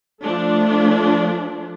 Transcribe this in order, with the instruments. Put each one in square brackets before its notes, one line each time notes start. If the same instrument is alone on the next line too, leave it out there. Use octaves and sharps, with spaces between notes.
[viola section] F3 A3 D4